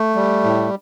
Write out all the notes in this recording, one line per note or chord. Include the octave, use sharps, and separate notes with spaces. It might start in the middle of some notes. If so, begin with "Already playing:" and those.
Already playing: A3
G3
A2